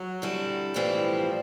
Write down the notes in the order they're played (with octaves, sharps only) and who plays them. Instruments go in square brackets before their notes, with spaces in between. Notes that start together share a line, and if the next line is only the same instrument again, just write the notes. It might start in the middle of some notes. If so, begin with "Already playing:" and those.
Already playing: [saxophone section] F#3
[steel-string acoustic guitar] D3 G3 C4 E4
[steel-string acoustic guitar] A2 E3 G3 C4 [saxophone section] F3